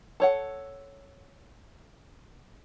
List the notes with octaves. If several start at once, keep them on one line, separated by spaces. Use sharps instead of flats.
A4 C#5 F#5